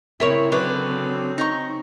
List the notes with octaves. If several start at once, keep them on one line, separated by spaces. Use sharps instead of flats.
C#3 C4 E4 A#4 C#5
D3 F#3 B4 D5
D#4 A#5 C#6